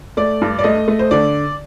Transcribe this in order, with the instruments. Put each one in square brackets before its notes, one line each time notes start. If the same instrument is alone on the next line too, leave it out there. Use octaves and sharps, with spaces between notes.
[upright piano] A3 D5
G2
D5
A3 D#5
A3
C5
D3 D5